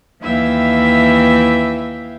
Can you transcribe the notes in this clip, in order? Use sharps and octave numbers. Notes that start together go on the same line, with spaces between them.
D#2 E3 E4 E5 F5 G5